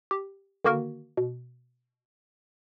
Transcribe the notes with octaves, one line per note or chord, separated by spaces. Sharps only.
G4
D3 D#3 A#3 F#4 A#4
B2